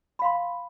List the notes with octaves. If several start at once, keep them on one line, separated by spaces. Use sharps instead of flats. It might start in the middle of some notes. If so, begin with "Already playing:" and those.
F5 B5 C6